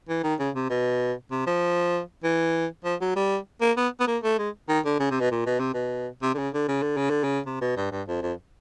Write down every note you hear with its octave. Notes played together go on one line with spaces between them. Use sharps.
E3
D#3
C#3
C3
B2
C3
F3
E3
F3
F#3
G3
A#3
B3
B3
A#3
A3
G#3
D#3
D3
C#3
C3
B2
A#2
B2
C3
B2
C3
D3
C#3
D3
C#3
D3
C#3
D3
C#3
C3
B2
G2
G2
F2
F2